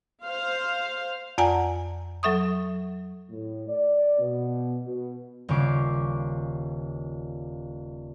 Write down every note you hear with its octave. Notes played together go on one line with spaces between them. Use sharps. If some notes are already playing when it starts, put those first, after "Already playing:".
C5 F5
F2 D5 F#5 G#5 A#5
F#3 A4 E5 C#6 D#6
A2
D5
B2
B2
D#1 C#3 C#4 D6 C7